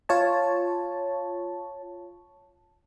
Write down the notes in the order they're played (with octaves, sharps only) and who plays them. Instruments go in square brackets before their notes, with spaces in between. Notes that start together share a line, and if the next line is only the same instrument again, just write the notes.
[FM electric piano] F4 C#5 A5